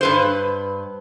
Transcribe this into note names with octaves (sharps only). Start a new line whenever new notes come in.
G2 B4 C5